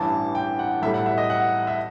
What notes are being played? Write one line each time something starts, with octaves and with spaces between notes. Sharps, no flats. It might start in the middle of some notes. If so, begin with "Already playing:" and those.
Already playing: A1 G2 E3 A5
G5
F#5
B1 A2 G3 E5
F#5
E5
D#5
F#5
E5